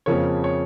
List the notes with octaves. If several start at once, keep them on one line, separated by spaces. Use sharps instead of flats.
F2 C#3 F3 A#3 C#5
C#5